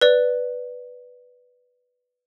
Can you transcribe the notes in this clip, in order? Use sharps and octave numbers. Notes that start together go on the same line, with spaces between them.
B4 D5